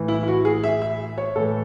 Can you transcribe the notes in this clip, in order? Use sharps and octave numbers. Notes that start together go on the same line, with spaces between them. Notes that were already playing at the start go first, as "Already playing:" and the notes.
Already playing: A2 E3
E4
E4
F#4
G#4
E5
E5
C#5
A2 E3 A4